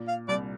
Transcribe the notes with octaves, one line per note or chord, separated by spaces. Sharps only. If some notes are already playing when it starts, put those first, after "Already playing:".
Already playing: A#2
F5
C2 D5